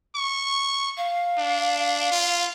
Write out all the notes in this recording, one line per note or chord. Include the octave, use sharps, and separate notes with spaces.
C#6
F5
D4
F4